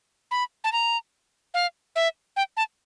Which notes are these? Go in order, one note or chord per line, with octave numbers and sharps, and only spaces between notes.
B5
A5
A#5
F5
E5
G5
A5